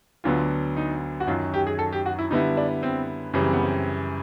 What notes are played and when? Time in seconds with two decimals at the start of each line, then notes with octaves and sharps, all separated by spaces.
0.24 D2 D3 F#3 B3 F4
0.77 D#4
1.20 F#4
1.27 F#2 D#3 F#3 F4
1.54 G4
1.67 G#4
1.79 A4
1.93 G4
2.06 F#4
2.19 E4
2.31 D3 G3 B3 D#4 E4
2.57 D4
2.83 C4
3.33 F#2 C#3 E3 G3 C#4
3.43 C4
3.53 B3
3.62 C4